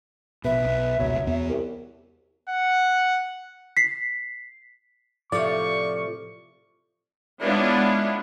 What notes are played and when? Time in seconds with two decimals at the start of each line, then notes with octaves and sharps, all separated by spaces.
0.44 A#1 B2 B4 E5
0.65 B1
0.99 F1 C#2 B2 F#3
1.26 E2 B3
1.50 C2
2.49 F#5
3.77 B6 C7
5.32 A2 C3 F3 D5 C#6
7.43 G#3 B3 C#4 D4 E4 F4